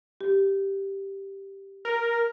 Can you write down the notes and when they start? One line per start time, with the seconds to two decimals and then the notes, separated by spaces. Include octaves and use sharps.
0.21 G4
1.85 A#4